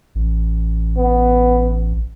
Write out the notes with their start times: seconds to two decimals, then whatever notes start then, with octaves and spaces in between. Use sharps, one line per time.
0.15 A1
0.97 B3